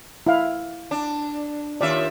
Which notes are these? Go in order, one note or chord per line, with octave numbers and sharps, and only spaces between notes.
E4 F5
D4
D#2 F4 D5 E5